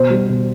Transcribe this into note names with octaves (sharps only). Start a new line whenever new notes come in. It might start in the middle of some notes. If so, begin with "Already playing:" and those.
Already playing: B2 C5
G3
B2